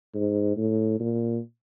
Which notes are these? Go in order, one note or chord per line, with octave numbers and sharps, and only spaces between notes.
G#2
A2
A#2